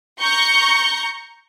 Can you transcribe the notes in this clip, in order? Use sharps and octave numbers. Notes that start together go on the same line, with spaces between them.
A#5 C#6 G6